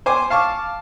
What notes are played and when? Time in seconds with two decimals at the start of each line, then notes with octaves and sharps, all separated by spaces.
0.06 C5 G#5 D6
0.30 F5 A5 C#6 D6